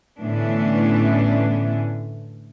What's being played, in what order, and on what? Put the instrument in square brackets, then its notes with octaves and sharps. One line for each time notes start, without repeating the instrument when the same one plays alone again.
[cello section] A2 D3 E3 B3 C#4 D4